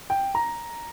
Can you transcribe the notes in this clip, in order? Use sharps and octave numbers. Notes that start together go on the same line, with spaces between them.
G5
A#5